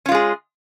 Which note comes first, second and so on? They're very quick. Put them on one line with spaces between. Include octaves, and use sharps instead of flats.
C#4 F4 G#3 G#4